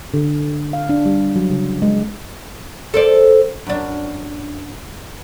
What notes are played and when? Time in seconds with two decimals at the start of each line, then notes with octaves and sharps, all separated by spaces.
0.14 D3
0.73 F5
0.89 D4
1.06 G3
1.36 F#3
1.50 C#3
1.82 G#3
2.94 A4 C5 D5
3.67 F#2 D4